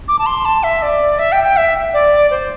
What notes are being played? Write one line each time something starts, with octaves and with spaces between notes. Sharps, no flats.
D6
A5
C6
A5
E5
D5
E5
G5
G5
E5
D5
C5